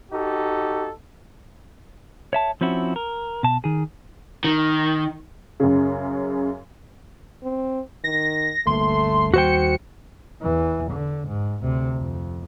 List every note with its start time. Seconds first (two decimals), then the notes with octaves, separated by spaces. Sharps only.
0.12 D#4 F#4 G4 A4
2.33 C#5 E5 A5
2.61 F3 C4 C#4 E4 F#4
2.96 A#4
3.43 B2 A5
3.64 D#3 G#4
4.44 D#3
5.60 F#2 C#3
7.43 C4
8.04 D#3 A#6
8.67 G1 D2 A3 A#3 C6
9.34 D#2 G3 F#4 C5 G5 C#7
10.42 E2 E3
10.91 D3
11.28 G#2
11.62 D2 C3
11.98 F2